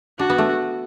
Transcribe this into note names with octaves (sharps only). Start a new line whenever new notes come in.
D4 F#4
B3
A3 D4